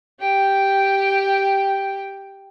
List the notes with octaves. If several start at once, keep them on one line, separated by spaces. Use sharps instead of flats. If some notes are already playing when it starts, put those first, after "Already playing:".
G4 G5